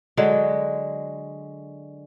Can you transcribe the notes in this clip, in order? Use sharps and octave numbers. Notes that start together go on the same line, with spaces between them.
D3 F#3 G#3